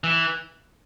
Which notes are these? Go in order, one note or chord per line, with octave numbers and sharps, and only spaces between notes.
E3